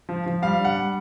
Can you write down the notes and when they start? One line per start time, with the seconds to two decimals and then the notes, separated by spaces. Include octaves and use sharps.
0.09 F3
0.26 F3
0.42 G3 F5
0.59 D4
0.65 F#5
0.76 G3